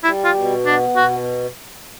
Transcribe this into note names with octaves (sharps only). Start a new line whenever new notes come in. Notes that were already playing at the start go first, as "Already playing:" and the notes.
G3 E4
F4
B2
B3 D4
B2 F#4